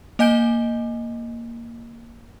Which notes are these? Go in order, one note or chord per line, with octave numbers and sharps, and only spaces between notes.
A#3 D#5 G#5 G6 D7 G7